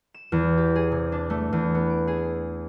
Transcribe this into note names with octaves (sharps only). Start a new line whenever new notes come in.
E7
E2
G4
G#4
C3
D4
A3
E2
B3
D7
G#4